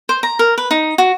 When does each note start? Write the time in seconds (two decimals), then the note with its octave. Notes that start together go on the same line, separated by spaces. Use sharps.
0.09 C5
0.23 A#5
0.39 A#4
0.58 B4
0.71 D#4
0.98 F#4